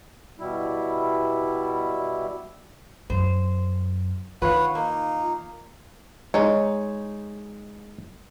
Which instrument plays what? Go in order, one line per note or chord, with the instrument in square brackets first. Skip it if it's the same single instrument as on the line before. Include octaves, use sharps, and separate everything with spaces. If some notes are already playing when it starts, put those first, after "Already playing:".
[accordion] B2 G3 E4
[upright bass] F#2 [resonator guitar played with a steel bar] C5
[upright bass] D#3 [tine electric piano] F4 F5 [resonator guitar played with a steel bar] B4 [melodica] C#5 F#5
[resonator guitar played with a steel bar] A#3 [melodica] D#4
[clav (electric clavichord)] G#3 [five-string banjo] D#4 C#5